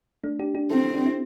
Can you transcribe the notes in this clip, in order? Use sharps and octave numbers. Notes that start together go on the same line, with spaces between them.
A3 D4
D4 G4
D4 G4
C4 E4 A4
D4 G4
C4 E4